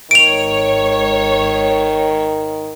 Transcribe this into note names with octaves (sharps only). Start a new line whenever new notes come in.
G#1 D#3 C#5 D7 F7